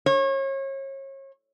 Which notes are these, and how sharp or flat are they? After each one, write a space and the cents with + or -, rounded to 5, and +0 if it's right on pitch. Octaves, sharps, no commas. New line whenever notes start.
C#5 -35